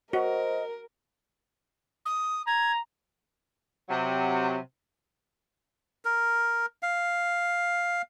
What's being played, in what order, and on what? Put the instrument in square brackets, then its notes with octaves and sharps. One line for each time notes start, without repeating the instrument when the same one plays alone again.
[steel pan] F#4 [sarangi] A#4 [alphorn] C5 [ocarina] D#5
[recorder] D#6
[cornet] A#5 [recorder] G#6
[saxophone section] C3 F#3
[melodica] A#4
F5